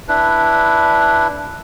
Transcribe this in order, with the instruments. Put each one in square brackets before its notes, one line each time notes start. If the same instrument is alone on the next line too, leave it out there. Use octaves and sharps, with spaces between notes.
[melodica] D4 E4 B4